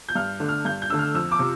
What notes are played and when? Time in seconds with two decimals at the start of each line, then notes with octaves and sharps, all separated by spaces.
0.09 G6
0.15 G2 F6
0.40 D3 A3 D4
0.49 F6
0.65 G2 G6
0.82 G6
0.90 D3 A3 D4 E6
0.99 F6
1.14 F2 E6
1.32 D6
1.39 C3 F3